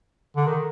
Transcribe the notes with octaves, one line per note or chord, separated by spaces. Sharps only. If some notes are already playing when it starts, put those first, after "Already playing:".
D3
D#3